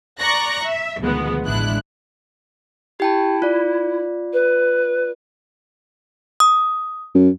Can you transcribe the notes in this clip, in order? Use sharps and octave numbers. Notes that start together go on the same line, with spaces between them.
D5 A#5 C#6 F#6 A#6
E5
D2 B2 D#3 F3 G#3 B3
A1 G#3 D4 E4 F#6
E4 G4 G5 A5
F4 D5
B4
D#6
F#2